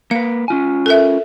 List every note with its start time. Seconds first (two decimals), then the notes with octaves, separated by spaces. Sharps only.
0.11 A#3 B4 F5
0.48 C#4 F4 G#5
0.86 A4 A#4 E5